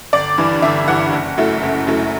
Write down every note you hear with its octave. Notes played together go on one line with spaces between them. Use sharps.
G1 D5
G2 E3
G1 E5
G2 E3 F#5
F#1
F#2 F#3 A3 E4
F#1
F#2 F#3 A3 E4